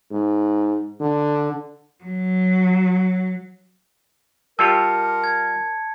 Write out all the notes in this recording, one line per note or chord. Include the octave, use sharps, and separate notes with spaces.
G#2
D3
F#3
G3 F4 G4 A#4 A5 E6 C#7
G#6